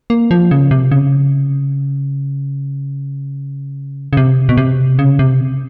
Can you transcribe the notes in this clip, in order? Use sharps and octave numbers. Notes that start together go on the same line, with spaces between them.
A#3
F3
C#3
C3
C#3
C#3
C3
B2
C3
C#3
C3